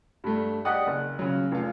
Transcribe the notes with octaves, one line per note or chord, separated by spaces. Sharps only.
G2 A3
G4 D5 D#5 F#5 D#6 F#6
F#1
C#3 F#3
F1 F4